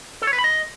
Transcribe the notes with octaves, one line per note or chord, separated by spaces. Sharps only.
A4
C#5
B4
B5
D#5